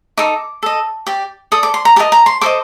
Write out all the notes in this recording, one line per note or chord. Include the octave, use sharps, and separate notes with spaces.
D#4 A4 D6
A4 D#5
G4 D5
A4 D5 D#6
D6
C6
A#5
G4 A#4 D#5 A5
A#5
C6
A4 C5 D#5 D6